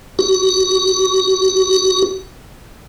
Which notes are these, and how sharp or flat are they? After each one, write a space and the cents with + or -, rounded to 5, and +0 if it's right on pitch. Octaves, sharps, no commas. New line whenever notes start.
F#4 +35